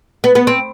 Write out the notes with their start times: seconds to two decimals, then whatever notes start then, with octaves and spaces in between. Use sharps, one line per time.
0.24 B3
0.35 B3
0.47 C4